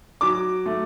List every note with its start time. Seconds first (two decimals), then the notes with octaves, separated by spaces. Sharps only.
0.21 F#3 D6
0.66 A3